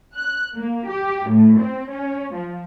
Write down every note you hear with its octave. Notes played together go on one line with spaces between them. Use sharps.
F#6
A#3
G4
A2
C4
C#4
F3